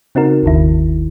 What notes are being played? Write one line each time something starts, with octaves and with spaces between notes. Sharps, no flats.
C#3 C4 D#4 F#4 A#4
G1 D#2 D#3 E4